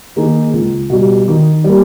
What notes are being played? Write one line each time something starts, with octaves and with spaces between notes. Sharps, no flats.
D#3 A#3 D#4 G#4
C#2
B2 G3
D#3
G3 A#3